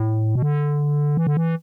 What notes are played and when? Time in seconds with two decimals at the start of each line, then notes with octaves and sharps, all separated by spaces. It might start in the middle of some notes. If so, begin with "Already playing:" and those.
Already playing: A2
0.35 B2
0.42 D3
1.17 E3
1.27 D3
1.37 E3